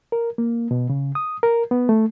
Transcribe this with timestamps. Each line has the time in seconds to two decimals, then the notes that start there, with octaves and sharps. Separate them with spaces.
0.12 A#4
0.38 A#3
0.71 B2
0.90 C#3
1.15 D#6
1.43 A#4
1.71 B3
1.89 A3